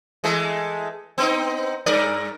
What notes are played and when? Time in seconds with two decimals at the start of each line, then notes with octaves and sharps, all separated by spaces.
0.24 E3 G#3 A3
1.18 B3 C4 D#4
1.86 G2 A#4 D5